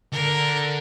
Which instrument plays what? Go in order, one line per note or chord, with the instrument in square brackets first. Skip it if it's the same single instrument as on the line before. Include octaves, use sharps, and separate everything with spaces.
[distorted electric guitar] D3 [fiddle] A#4